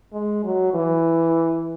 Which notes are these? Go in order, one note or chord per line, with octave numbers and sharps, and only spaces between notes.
G#3
F#3
E3